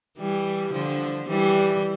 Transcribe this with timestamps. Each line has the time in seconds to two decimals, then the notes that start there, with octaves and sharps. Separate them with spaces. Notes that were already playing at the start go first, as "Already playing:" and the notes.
0.19 E3 G3
0.73 D3 F3
1.29 E3 G3